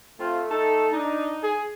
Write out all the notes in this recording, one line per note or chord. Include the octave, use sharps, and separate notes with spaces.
A3 C4 F4
D#4 A4
D4 D#4
G#4